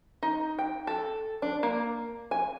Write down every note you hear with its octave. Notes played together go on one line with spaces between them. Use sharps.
D#4
G5
A4
D4
A#3
G#5